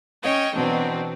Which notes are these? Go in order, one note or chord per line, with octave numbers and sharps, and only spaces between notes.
C#4 C#5 D#5 G5
B2 E3 F#3 C4 D4